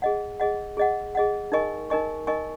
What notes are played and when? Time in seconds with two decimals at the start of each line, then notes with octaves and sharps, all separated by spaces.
0.02 G#4 D#5 F#5
0.40 G#4 D#5 F#5
0.77 G#4 D#5 F#5
1.15 G#4 D#5 F#5
1.52 D#4 A#4 D#5 G#5 C#6
1.90 D#4 A#4 D#5 G#5 C#6
2.27 D#4 A#4 D#5 G#5 C#6